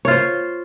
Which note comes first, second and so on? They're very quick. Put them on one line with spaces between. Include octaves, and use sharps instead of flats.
C#5 F4 C5